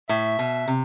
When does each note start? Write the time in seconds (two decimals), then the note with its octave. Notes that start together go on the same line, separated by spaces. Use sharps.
0.09 A2 E5
0.39 B2
0.68 C3